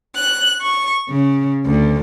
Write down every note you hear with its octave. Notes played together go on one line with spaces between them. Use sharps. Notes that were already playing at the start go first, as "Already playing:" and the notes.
F#6
C#6
C#3
D2